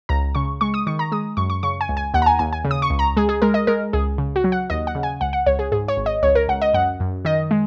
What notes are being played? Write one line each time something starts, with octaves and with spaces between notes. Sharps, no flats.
C#2 A#5
C#3 C#6
G#3 C#6
D#6
D#3 C#6
A#5
G#3 D#6
F#2 C#6
C#6
C#3 C#6
G#5
C#2
G#5
D#2 F#5
A#5
G#5
D#2 G#5
G#5
C#3
D#6
C#6
C#2
A#5
G#3 G#4
G#4
G#3 A#4
D#5
G#3 A#4
C#2 G#4
C#3
F#4
F#3
F#5
D#2 D#5
F#5
C#3
G#5
C#2 F#5
F#5
C#2 C#5
G#4
G#2 G#4
C#5
G#1
D#5
C#2 C#5
A#4
C#2 F#5
D#5
F#2 F#5
F#2
D#3 D#5
G#3